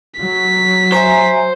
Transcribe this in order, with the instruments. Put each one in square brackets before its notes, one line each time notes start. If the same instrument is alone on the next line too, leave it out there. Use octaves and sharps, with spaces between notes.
[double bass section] F#3 [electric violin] B6
[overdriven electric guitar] C5 [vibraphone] E5 G#5 A#5